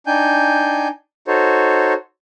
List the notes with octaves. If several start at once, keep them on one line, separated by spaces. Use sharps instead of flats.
D4 D#4 G5 G#5 G6
D#4 F#4 A4 C5 C#5